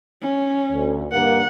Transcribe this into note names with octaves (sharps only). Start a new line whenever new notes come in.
C#4
D2
G2 A#3 F#5